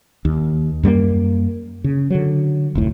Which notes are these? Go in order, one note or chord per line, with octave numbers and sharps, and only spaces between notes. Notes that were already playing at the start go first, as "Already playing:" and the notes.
D#2
F#2 G3 A3 A#3
C#3
D3 F#3
F1 D2 A2